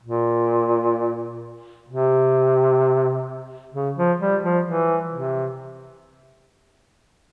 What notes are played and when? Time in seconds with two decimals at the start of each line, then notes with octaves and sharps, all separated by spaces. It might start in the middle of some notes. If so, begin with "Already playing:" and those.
0.03 A#2
1.89 C3
3.74 C#3
3.96 F3
4.20 G3
4.43 F3
4.66 E3
5.13 C3